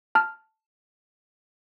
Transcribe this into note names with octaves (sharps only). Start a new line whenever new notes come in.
A5 F6